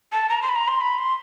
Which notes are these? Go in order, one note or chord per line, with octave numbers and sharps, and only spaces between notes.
A5
A#5
C6
B5
A#5
C6
B5
C6